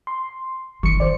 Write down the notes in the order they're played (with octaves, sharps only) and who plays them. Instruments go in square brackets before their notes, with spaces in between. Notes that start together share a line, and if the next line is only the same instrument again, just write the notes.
[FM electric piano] C6
[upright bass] G1 D#3 [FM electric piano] C#6 C#7
[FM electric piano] C5 D5